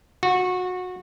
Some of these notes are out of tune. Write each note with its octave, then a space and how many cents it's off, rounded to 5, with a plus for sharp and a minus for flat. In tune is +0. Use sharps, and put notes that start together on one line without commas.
F#4 -25